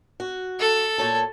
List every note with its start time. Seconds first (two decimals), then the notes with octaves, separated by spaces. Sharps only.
0.20 F#4
0.60 A4
0.98 A#2 C#5 A5